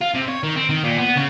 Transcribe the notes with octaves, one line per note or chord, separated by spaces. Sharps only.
F4
C3
C#5
D#3
C4
D#3
A#2
B3
C#3